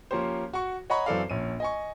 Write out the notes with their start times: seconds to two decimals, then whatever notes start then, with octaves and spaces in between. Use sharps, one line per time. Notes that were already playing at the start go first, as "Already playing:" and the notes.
0.11 F3 A#3 C#4 G4 C5
0.53 F#4 C#6
0.90 C#5 D#5 F#5 A#5 B5 C#6
1.06 F#2 E3 C4 A4 D5 F5
1.30 A#1 C#4 D#7
1.60 D#5 G#5 C#6